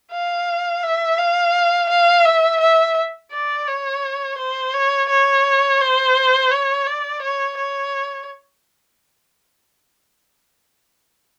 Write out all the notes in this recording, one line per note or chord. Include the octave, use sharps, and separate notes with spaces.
F5
E5
F5
F5
E5
E5
D5
C#5
C5
C#5
C#5
C5
C#5
D5
C#5
C#5